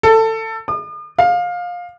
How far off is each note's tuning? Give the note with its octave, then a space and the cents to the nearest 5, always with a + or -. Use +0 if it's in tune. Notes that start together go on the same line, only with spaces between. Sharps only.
A4 +20
D#6 -45
F5 +20